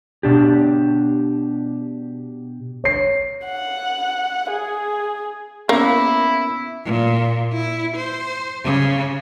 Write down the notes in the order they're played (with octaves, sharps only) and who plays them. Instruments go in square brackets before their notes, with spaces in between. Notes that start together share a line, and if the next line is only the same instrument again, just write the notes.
[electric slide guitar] B2 D4 G4
[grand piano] C#5 C7
[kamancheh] F#5
G#4
[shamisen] A#3 [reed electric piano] B3 C#4 D6 [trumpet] E4
[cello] A#2
E4
C5
C#3